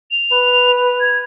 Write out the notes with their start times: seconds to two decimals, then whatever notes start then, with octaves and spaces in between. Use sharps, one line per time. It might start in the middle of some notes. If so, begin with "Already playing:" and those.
0.11 F7
0.32 B4
1.00 G#6